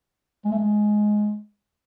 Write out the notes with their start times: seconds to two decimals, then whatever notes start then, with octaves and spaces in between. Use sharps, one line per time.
0.45 G#3
0.52 A3
0.59 G#3